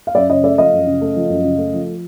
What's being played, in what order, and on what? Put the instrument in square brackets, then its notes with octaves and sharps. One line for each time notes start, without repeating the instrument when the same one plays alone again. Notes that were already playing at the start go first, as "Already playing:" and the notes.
[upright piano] F5
F#2 D5 E5
C#3 C#5 D#5
A3 D5 E5
F3 D#5 F5
F#2
C#3
A3
F3
F#2
C#3
A3
F3